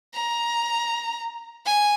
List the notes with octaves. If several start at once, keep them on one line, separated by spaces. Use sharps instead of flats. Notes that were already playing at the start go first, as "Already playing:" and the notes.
A#5
G#5